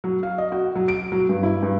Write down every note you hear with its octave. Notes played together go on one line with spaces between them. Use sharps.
F#3
F5
D#5
F#4
F#3
D7
F#3
G2
E4
G2